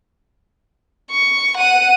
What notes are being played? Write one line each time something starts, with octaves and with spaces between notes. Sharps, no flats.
C#6
F#5 D#7